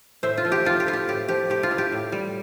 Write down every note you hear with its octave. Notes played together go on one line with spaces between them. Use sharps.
A2 C5 E5
F4
F3
G4
A3 F4
G4
E4 F4
G4
A2 G4
F3 G4
A3 G4
F4
E4
G4
A2
G3